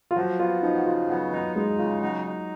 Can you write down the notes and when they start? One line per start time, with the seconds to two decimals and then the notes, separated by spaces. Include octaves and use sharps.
0.11 F4
0.16 F3 F#3 F#4
0.39 B3 F4
0.62 F3 D#4
0.76 F#4
0.85 C#3 F4
1.09 F#3 B3 F#4
1.32 F#3 D#4 F#4
1.56 G#3 D#4 G#4
1.79 C#3 F4
2.02 F#3 D#4 F#4
2.26 D#4